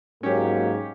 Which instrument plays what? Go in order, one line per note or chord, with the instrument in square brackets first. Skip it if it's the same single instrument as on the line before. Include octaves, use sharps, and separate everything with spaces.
[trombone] G#2 [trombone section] F#3 A#3 [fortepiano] C#4 G4